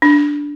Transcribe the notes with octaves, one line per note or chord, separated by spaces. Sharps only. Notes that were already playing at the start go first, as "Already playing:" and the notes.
D4